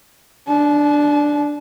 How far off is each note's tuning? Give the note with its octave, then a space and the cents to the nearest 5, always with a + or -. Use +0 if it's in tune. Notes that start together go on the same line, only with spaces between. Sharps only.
D4 +0 A5 -40